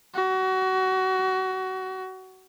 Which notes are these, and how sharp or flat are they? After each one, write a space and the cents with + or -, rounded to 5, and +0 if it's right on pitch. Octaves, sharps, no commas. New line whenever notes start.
F#4 +25